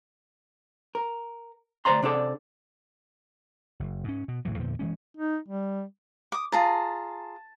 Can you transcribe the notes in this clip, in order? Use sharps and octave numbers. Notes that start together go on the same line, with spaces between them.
A#4
D2 C5 D5 A#5 C6
C3 D4 G#4 A4 D5
F#1
G#2 C#4
B2
F1 A2 E3 F#3
E2 A#2 D3 F3
E3 G#3 C#4
D#4
G3
D6 D#6
F4 G#4 A5 A#5